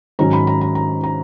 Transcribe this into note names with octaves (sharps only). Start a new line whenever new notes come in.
G#2 D#3 F#3 C#4 A#5
B5
A#5
A#5
A#5
A#5